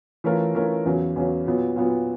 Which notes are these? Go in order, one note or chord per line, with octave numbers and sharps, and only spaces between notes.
E3 A3 C#4 F4 A#4
E3 A3 C#4 F4 A#4
E2 C#3 F#3
E2 C#3 F#3
A#2 F#3 B3
A#2 F#3 B3